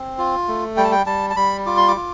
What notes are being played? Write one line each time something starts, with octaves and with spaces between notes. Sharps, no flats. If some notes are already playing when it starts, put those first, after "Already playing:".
Already playing: C4
F4
A3
G3 G5
A5
G5
G3 A5
A5
G3 B5
F4 D6
C6
D6
F4